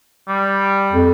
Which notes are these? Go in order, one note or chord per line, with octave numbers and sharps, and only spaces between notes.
G3
F2